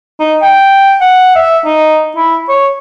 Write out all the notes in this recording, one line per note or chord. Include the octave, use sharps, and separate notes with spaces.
D#4
G5
F#5
E5
D#4
E4
C#5